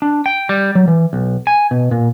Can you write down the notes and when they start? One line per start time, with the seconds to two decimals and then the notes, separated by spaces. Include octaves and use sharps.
0.02 D4
0.26 G5
0.49 G3
0.75 F#3
0.88 E3
1.13 B1
1.47 G#5
1.71 B2
1.91 A#2